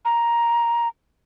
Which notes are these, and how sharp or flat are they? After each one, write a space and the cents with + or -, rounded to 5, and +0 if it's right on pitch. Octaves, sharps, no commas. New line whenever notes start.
A#5 +10